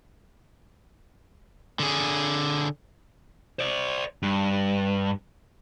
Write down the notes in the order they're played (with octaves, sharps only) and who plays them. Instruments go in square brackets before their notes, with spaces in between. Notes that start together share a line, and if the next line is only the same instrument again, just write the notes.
[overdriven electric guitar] D3 G#4
[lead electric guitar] C5 D5
G2